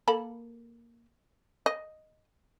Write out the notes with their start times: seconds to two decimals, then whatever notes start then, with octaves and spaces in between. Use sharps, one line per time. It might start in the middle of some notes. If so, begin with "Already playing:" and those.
0.08 A#3 A4 B5
1.66 D#5